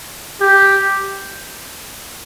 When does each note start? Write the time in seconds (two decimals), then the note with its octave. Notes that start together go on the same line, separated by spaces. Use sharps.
0.41 G4